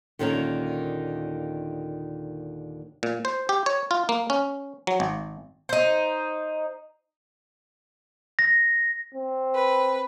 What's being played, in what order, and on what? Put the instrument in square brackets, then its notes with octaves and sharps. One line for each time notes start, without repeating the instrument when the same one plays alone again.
[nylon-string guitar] D#2 A#2 D3 D#3 C#4 A#4
[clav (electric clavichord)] A#2
C5
G4
C#5
F4
A#3
C#4
F#3
G#1
[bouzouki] D#4 C5
[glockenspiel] A#6
[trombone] C4
[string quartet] B4